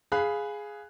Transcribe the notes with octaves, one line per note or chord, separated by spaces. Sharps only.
G#4 F5 B5 F#6